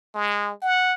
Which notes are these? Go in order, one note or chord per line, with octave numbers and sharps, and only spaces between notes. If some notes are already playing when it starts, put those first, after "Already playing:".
G#3
F#5